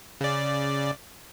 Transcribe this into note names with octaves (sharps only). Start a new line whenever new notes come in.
C#3 D5